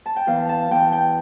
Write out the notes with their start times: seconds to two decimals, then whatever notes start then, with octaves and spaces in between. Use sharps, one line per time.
0.06 A5
0.16 G5
0.27 E2 F5
0.49 A5
0.70 E2 G5
0.92 G5